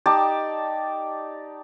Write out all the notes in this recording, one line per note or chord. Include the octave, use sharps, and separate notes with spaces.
D#4 G4 D5 A5